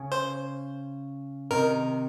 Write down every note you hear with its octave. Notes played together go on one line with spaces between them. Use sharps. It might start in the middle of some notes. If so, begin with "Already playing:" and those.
Already playing: C#3
C5
C3 D#3 A#4